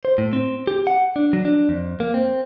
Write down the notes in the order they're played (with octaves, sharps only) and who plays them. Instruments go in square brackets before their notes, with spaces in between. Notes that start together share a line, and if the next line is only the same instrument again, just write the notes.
[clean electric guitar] C5
A2
C4
G4
F#5
D4
F#3
D4
F2
A#3
C4